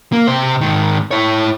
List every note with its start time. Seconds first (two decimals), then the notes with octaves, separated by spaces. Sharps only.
0.13 A#3
0.27 C3 C5
0.61 G#2 D#3
1.11 E4 C#5